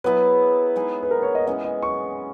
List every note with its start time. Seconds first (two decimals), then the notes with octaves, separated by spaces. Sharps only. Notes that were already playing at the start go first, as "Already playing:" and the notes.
0.04 F#3 B3 E4 G#4 B4
0.76 G#3 D#4 G#4
1.03 B4
1.11 A#4
1.23 C#5
1.35 D#5
1.47 E3 G#3 C#4 D#5
1.65 D#5
1.82 C#6